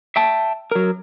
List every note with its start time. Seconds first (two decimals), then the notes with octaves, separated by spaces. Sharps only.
0.16 E5 G5 A5
0.71 F#3 A#4